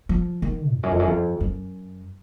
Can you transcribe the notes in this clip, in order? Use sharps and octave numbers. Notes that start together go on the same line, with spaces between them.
F3
D#3
F2
F#2
F2
F#2
F2
F#2